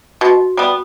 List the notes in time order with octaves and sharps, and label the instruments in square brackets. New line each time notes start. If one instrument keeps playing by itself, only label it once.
[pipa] B2 [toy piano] F#4
[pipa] G3 B3